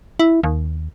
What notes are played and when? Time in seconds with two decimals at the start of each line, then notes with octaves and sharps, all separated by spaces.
0.19 E4
0.43 D#2